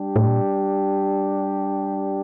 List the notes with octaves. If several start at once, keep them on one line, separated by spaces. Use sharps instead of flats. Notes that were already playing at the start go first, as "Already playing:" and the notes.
Already playing: G3 D4 G4
A2
A#2